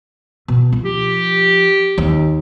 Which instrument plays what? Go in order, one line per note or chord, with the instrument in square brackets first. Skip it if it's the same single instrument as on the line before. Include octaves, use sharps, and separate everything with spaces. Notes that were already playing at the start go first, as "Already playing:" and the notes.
[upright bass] B2
F3
[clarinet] G4
[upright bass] D#2